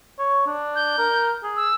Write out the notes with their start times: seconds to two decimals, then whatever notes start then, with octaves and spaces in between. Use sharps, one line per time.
0.19 C#5
0.47 D4
0.75 G6
0.98 A#4
1.43 G#4
1.57 E6